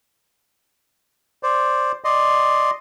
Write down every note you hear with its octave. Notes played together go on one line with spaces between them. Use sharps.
C5 D5
D5 D#5 C6